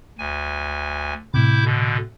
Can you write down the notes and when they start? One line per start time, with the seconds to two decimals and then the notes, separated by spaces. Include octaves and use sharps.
0.18 D2 G#5
1.34 A2 C3 E4 D6 G6
1.65 B2 D3